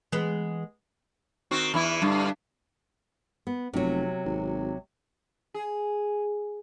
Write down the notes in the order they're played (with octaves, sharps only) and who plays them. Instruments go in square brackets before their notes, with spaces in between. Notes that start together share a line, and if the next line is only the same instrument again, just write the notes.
[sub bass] E3 [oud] G#3 B3
[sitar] D#3 C4 F#4
E2 E3 E4
G2 D3
[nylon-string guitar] B3
[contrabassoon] F1 [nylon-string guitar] C3 F#3
[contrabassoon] G#1
[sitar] G#4